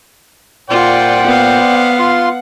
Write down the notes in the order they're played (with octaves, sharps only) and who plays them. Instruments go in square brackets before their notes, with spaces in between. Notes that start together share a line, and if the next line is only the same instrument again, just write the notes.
[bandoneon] A#2 [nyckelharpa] F4 [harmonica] C5 D5 G5 [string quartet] F#5
[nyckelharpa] B3 F5
[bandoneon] F4 C6